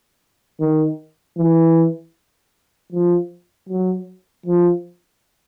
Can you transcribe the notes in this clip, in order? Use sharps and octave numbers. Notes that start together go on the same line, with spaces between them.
D#3
E3
F3
F#3
F3